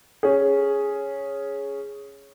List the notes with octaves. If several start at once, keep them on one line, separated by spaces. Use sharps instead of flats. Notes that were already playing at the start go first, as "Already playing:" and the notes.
C#4 G#4